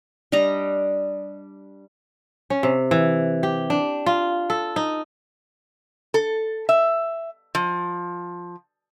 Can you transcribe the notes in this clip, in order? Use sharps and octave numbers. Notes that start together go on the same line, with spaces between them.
G3 D4 D#5 A#5
C#4
C3
E3
G4
D4
F4
A4
D#4
A4
E5
F3